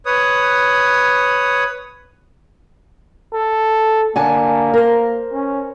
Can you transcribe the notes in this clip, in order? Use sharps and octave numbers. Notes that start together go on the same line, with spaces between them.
B4 C#5 D#6
A4
D3 A#3 G#5 A5
A#4 C5
C#4